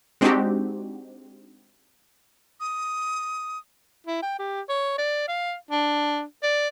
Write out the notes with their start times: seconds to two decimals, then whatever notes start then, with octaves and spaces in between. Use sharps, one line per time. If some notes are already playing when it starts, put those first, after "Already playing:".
0.21 G#3 C4 D4 D#4 F#4 G4
2.60 D#6
4.07 E4
4.23 G5
4.39 G4
4.69 C#5
4.98 D5
5.28 F5
5.71 D4
6.43 D5